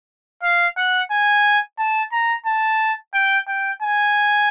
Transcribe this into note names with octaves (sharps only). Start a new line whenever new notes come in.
F5
F#5
G#5
A5
A#5
A5
G5
G5
G#5